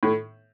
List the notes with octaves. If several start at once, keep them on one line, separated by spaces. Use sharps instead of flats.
A2